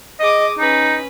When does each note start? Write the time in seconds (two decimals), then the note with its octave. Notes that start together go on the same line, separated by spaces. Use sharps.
0.20 G#4 D#5 D6 D#6
0.58 C#4 D#4 B4